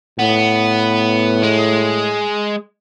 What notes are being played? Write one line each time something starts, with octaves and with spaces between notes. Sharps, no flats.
A2 B3
G#3